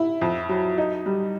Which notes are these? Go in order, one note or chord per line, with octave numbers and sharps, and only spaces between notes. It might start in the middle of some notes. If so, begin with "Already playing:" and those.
Already playing: E4
F2
F#3
D#4
G3